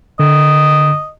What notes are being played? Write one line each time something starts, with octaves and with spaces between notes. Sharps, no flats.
D3 D#5